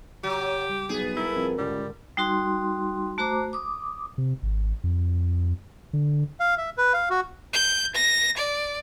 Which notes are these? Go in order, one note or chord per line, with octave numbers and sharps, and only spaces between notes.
C#3 F#3 G4
G3
B1 B3 G#4
A#3 E4 A4 A#4
F2
C#2 G#2 D3 G3
G3 D#4 F#4 C6
A3 F#4 C5 A#5 D6
D6 D#6
C3
G#1
F2
D3
F5
E5
B4
F5
F#4
G6
A#6
D5